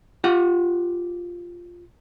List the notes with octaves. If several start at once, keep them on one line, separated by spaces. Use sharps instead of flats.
F4 G4 F#5